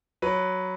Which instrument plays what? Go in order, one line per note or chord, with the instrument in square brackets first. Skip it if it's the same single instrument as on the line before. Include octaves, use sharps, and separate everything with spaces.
[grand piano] F#3 B4